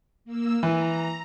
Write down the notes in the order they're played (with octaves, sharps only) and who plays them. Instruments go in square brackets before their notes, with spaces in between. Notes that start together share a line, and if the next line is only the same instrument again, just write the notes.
[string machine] A#3 E6
[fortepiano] E3 [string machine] A#5